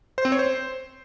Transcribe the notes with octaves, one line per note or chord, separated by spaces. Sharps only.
C5
C4
C#5
C5